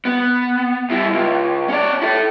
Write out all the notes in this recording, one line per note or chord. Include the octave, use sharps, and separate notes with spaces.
B3
G2 E4
C#2
C#4 D5
E4 A4